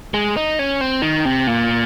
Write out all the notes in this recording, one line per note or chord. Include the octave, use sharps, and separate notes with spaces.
G#3
D#4
C#4
C4
D#3
C3
A#2